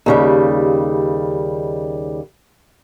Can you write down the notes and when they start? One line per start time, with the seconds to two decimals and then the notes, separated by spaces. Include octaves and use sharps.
0.06 D#2 C#3 G3